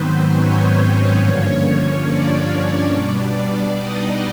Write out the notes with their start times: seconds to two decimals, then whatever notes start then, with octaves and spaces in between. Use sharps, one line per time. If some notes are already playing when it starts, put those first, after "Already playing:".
Already playing: G#2 D#3 F#3 B3 C4 B4 C5
0.30 C#4 C#5
1.16 G2 D3 F3 A#3
2.03 D4 D5
2.89 B2 G3 B3 D4 D5
3.76 D#4 D#5